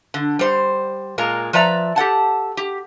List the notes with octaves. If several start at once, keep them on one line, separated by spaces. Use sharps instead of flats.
D3
G3 C5
A#2 G#3 A#4 A#5
F3 B4 D5 E5 A#5
G4 A4 F#5 A5
G4